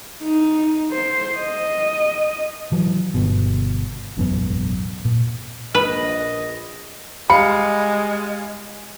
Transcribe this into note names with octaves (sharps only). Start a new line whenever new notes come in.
D#4
C5
D#5
E3 F#3
G1 B2
E1 A1 F#2 B3
A#2
A#1 B4 D#5
G3 G#3 F5 B5 C#7